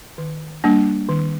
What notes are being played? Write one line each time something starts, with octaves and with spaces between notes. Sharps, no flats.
D#3
G3 A#3 D4
D#3